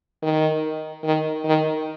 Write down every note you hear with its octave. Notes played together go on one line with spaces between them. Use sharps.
D#3
D#3
D#3